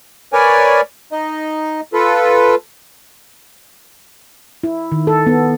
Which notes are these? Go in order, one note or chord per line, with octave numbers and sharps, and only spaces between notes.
A#4 B4 C#5 D5 G#5
D#4 D#5
F4 A4 B4
E4
D#3
A4
B3